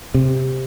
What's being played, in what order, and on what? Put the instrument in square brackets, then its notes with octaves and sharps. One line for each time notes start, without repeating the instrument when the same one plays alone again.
[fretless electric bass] C3